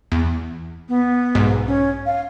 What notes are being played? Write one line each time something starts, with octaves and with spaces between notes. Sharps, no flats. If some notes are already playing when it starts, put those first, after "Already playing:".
E2
B3
B1 G#2
C#4
F5